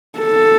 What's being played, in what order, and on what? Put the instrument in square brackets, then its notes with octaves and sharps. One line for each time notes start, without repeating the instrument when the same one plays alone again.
[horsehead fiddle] A4